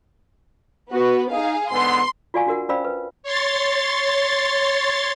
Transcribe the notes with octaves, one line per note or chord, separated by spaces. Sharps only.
B3 F#4 B4
D#4 G#4 F5
G#2 D3 B3 C6
F4 F#4 D5 F5 G#5 C#6
D4 F#4 A#4 F#5
C#4 C5 D5 F5 B5 E6
B4
C#5 C6 A6